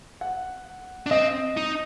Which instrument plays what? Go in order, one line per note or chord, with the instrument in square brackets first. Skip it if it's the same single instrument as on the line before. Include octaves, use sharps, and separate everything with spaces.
[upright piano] F#5
[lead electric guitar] D4
[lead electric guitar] C4 [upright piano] D#5
[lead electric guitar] D#4